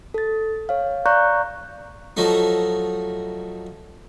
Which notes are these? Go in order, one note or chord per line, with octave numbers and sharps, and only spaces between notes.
A4 A6
C#5 F5
D5 F5 A#5 C#6 F#6 G6
F3 F#3 A3 D#4